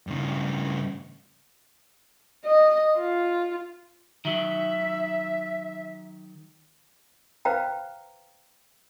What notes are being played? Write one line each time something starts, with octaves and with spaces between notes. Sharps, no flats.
G2 C#3
D#5
F4
D#3 F#3 E5
B4 C5 F5 G5 A#5